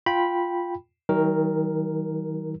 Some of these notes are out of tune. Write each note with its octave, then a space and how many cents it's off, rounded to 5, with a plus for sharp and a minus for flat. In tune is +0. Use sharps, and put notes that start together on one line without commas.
F4 +0 G5 +0 B5 -10
D#3 +35 F#3 +45 A#4 +0